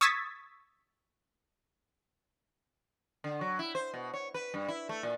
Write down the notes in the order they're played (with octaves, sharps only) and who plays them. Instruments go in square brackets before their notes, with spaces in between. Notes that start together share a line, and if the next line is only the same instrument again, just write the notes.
[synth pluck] C#6 D#6 E6 G#6 A6 B6
[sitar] D3
F#3
E4
C5
B2
C#5
B4
G2
E4
A3
A#2